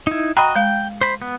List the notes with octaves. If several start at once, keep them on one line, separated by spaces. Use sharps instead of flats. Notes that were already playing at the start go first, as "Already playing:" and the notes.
D#4 E4
F#4 D#5 G5 A#5 B5
G#3 F5 G5
C5 B5
B3